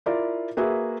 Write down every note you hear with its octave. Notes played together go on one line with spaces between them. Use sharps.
E4 F4 A#4 D5
A#3 F#4 G#4 B4 E5